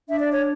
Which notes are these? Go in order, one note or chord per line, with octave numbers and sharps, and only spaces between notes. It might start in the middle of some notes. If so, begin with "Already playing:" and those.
D4 E5
D5
C#5